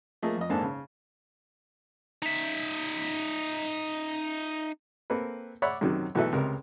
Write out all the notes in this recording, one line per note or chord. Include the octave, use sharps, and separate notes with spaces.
F3 A3 A#3 G#4 A#4 D#5
F2 D#5
G#1 G#2 A#3 D4 A4 A5
C#3
D#4 E5
A#3 C4 A4 B4
C#5 D5 E5 F#5 B5 D6
F#2 C3 D#3 F#3
B1 E3 F#4 A4 B4 E5
C#2 C3 A#4 A#5